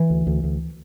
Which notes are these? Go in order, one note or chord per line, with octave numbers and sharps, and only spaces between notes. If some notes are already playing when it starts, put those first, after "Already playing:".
Already playing: E3
D2
D2
D2